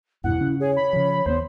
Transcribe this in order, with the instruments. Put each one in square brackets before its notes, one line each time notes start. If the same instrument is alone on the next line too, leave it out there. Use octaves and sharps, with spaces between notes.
[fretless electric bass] E2 G2 B2 [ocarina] E4 [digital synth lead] F#5
[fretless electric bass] C#3 C#4
[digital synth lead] G#4 [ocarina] C#5
[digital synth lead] B5
[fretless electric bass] C#3 F3
[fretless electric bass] D#2 G#3 B3 [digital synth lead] C5